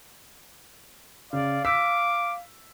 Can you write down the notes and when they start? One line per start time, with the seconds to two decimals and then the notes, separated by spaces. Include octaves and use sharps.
1.33 C#3 D5 F5
1.65 D6 E6 B6